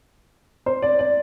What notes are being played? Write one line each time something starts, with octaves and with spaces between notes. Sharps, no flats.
C5
D5
D5